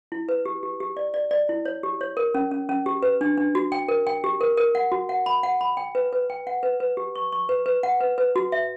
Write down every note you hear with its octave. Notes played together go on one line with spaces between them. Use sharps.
E4
B4
G4
G4
G4
D5
D5
D5
E4
C#5
G4
C#5
A#4
C#4
C#4
C#4
G4
B4
D4
D4
F#4
G5
A#4
G5
G4
A#4
A#4
F#5
F#4
F#5
B5
F#5
B5
G5
B4
B4
G5
F#5
B4
B4
G4
C#6
C#6
B4
B4
F#5
B4
B4
F#4
E5